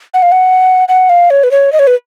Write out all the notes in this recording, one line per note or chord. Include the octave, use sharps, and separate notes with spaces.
F#5
F5
F#5
F#5
F5
C#5
B4
C#5
D#5
C#5
B4